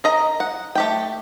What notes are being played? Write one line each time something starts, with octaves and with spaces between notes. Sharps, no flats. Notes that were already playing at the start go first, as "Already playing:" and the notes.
A#4 D#5 A#5
F#5
A3 G4 G5